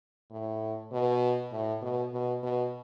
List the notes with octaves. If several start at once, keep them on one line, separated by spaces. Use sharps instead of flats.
A2
B2
A2
B2
B2
B2